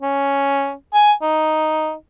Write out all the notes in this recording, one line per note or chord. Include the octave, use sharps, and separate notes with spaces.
C#4
G#5
D#4